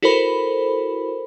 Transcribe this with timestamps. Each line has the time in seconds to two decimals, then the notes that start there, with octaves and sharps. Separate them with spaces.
0.02 E4 F#4 A4 A#4 C5 B5